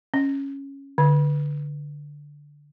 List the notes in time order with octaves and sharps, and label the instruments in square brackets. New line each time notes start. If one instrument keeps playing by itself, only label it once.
[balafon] C#4
D3